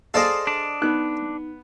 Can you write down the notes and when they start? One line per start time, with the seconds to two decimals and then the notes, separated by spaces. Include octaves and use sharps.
0.14 G#4 A4 C5 D5 D#5 F5
0.47 D4
0.82 B3 D#4 F#6